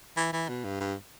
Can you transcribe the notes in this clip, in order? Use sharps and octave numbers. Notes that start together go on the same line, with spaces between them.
E3
E3
B2
G2
G2